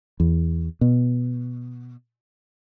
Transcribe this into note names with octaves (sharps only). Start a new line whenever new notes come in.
E2
B2